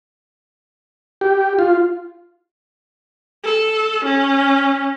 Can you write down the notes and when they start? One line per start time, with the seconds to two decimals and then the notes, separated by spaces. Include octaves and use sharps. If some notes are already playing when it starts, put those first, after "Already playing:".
1.21 G4
1.59 F4
3.44 A4
4.05 C#4